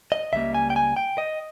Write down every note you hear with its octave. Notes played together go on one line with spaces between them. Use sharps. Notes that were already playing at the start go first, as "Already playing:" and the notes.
D#5
C#2 C#3 G3 A#3 E5
G#5
G5
G#5
G5
D#5